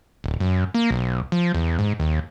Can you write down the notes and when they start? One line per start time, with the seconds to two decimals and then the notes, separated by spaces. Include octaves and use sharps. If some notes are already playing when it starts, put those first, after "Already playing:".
0.24 D1
0.40 F#2
0.74 A#3
0.91 B1
1.32 F3
1.55 E2
1.79 G#2
2.00 D#2